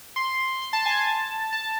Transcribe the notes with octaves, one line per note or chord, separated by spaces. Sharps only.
C6
C6
A5
G#5
A5
A5